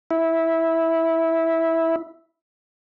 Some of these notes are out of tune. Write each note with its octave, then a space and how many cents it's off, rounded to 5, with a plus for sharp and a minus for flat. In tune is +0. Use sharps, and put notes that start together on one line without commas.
E4 -10